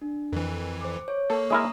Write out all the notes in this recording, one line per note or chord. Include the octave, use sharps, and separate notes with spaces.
D4
F2 E3 A#4
C5 D6
C#5
A#3 A4 A#4 C#6
G#3 E4 A#4 A#5 D#6